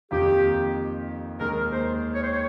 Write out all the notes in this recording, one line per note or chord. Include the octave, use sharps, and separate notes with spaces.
F2 D#3 A#3 F4 G4
D#2 D#3 G#3 A#4
C5
C#5
C5
C#5